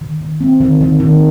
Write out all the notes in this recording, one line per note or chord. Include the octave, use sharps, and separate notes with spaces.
D#3
D#3
C4
D#3
D#3
D#3